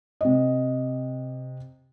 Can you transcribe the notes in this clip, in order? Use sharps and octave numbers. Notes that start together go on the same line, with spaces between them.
C3 D#5